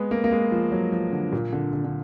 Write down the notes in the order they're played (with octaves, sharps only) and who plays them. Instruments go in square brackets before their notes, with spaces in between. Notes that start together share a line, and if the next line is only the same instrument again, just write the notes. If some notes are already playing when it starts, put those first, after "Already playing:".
Already playing: [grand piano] G#3 B3
A#3
A#3
G#3
F3
F#3
F3
D3
A#2
D3
D3
D3